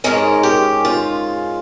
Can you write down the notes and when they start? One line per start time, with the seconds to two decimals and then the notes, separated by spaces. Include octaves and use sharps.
0.04 G#2 D#3 G#3 C#4 A#4
0.43 G4
0.85 F4